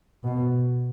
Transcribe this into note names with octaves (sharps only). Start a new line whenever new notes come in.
B2